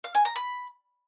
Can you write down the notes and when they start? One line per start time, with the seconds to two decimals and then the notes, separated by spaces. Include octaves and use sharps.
0.04 F5
0.15 G#5
0.25 A#5
0.36 B5